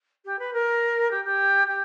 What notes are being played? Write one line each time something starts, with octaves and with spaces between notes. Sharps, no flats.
G4
B4
A#4
G4
G4
G4